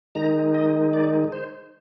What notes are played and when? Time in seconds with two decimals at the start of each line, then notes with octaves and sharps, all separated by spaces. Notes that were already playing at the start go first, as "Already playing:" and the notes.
0.15 D#3 G#3 D#4 A#5
0.54 D#5
0.93 D5
1.32 C5